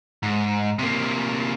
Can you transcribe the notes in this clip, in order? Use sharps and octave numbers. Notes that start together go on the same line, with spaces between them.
G#2
C3 A#3